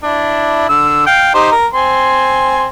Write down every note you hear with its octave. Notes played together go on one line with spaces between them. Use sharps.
D4 E4
D3 E6
F5 G5
D#4 G4 C5
A#4
C4 G#5 C6